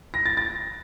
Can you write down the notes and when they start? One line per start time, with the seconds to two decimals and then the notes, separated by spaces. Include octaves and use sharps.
0.14 A#6
0.26 A6
0.37 A6